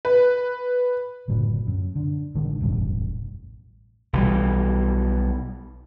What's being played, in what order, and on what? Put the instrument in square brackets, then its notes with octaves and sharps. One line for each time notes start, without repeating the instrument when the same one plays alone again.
[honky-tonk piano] B4
[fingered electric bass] F#1 A2 D3 F#3
F#2
D3
A1 D3 D#3 G#3
E1 A1 F#2 G3
[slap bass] B1 E3 G3